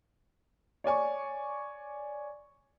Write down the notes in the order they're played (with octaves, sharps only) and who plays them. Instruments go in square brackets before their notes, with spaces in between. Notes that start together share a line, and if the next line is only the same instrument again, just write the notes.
[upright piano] C#5 D5 G#5 C#6